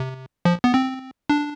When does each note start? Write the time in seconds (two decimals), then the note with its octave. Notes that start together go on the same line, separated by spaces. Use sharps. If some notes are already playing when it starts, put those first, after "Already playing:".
Already playing: C3
0.45 F3
0.64 B3
0.74 C4
1.30 D4